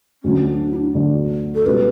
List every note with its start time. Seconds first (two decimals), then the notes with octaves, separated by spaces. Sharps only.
0.23 D2 D3 F#3 C#4
0.47 D4
0.71 E4
0.76 D4
0.94 D2 D3 F#3
1.55 A4
1.65 C#2 B2 G3 B4